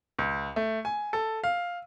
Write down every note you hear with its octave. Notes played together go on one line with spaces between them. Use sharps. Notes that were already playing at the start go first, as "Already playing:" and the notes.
C#2
A3
G#5
A4
F5